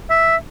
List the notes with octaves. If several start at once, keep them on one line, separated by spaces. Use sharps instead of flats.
E5